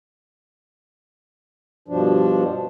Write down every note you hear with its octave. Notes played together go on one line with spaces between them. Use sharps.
G2 B2 F3 D4